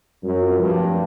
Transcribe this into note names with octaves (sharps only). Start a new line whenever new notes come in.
F#2 G3
C4 F4
G2 F3
A3 C4